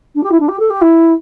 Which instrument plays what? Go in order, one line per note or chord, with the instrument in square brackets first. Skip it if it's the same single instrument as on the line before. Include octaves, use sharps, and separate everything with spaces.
[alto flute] D4
G4
E4
D4
G4
A4
G4
E4